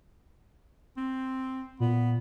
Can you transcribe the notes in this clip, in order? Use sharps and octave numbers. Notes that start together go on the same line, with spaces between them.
C4
A#2 B3